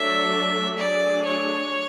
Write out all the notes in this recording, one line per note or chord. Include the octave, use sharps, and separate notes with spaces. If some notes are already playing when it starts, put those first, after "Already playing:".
Already playing: F#3 A3 D4 A4 D5 E5
F#3 A3 D4 G#4 D5
C#5